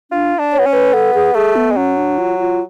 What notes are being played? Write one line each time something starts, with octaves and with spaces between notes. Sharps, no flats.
D4 F4
D4
C#5
B3
C#4
B4
B3 A4
G#4
A3 G#4
B3
G#3
F#3 C#4
D4
F4
F4